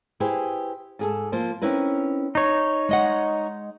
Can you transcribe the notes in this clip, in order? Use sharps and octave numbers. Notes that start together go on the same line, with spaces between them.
E4 G4 G#4 B4 C5
G#2 G#4 A4
F3 A#3 C5
C4 C#4 D#4 E4 A#4 B4
D#4 C#5
G#3 D#5 F#5